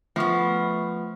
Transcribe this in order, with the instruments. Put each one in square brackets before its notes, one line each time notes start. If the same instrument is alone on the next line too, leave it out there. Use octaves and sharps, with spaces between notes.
[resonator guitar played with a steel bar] F3 B3 [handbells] A3 C#6